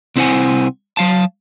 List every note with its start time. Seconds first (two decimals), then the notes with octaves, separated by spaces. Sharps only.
0.16 C2 C4 E4 C5 F#5 G#5
0.97 F#3 F5 A5